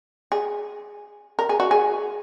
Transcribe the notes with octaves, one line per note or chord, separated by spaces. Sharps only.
G#4
A#4
G#4
F#4
G#4